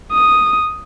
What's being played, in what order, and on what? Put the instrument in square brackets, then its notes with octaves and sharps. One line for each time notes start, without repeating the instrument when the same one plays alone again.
[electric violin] D#6